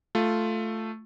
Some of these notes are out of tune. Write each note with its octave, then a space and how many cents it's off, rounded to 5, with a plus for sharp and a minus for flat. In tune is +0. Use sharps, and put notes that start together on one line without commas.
A3 +0 F4 +0